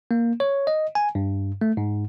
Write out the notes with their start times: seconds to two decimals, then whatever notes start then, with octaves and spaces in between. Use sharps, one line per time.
0.11 A#3
0.40 C#5
0.67 D#5
0.95 G#5
1.15 G2
1.61 A3
1.77 G#2